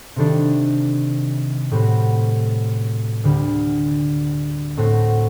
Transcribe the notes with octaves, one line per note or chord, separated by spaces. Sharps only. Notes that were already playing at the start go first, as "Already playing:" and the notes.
C3 D#3 G3 D4 A4
A2 G3 C4 F#4
D2 D3 G3 D4
A2 A3 C4 F#4